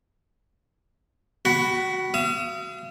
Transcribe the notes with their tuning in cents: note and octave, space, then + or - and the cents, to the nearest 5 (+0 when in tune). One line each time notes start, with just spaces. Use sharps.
F#4 +0 F#5 +40 B5 +0
F5 -40 D#6 +40